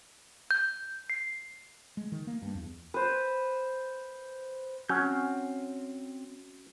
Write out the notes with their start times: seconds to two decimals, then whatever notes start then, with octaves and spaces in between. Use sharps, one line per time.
0.51 G6
1.10 C7
1.97 G#3
2.12 D#3
2.27 A#3
2.42 G2
2.55 E2
2.94 B4 C5
4.89 F#3 C4 C#4 F6 G6